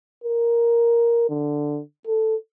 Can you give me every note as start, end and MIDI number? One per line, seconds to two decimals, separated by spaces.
0.24 1.26 70
1.30 1.81 50
2.07 2.36 69